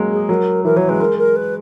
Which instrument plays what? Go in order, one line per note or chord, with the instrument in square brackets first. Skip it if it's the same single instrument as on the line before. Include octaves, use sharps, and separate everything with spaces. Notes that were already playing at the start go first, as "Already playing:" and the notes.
Already playing: [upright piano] F#3 G#3 A#3
[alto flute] G#4
[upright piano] F#3 [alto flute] A#4
[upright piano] E3 [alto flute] A#4
[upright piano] F#3 [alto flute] C#5
[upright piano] G#3 [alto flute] B4
[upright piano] G#3 [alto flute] A#4
[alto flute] A#4
B4